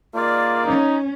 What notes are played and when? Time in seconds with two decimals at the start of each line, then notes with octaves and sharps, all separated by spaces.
0.15 D#3 A#3 F4 G#4 D5
0.65 C#4 D#4